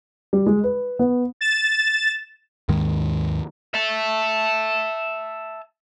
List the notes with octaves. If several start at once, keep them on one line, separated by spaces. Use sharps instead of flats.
G3
G#3
B4
B3
A6 E7
D#2 G#2 D#3 G#3
E5 A5